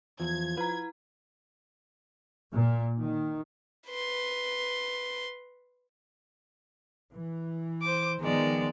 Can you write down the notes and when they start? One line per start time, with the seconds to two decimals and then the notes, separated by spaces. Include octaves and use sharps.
0.20 E2 F3 G#6
0.57 E4 B4 A#5
2.52 A#2
3.01 D#3
3.88 B4 C6
7.15 E3
7.82 C5 D6
8.21 D#3 F3 G#3 B3 D5